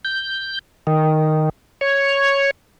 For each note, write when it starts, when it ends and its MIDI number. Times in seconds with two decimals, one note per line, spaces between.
0.05 0.59 91
0.87 1.49 51
1.81 2.51 73